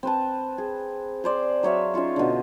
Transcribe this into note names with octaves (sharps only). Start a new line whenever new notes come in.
C4 B4 A5
G#4
G#4 C5 D5
F#3 C#5 E5 F5
C#4 D#4 F4 C#6
B2 D3